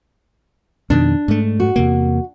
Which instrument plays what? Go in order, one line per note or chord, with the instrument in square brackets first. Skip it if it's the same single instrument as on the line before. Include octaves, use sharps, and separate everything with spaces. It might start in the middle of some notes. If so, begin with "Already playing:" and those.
[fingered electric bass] F2 B2 D#3 [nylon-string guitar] D4
[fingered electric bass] G#2 A3
[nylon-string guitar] F#4
[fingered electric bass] E2 C3 A#3